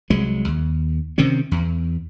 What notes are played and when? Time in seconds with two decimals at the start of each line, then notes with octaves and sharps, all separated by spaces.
0.10 C2 F#3 G#3
0.48 D#2
1.18 C3 D#3 C4 C#4
1.51 E2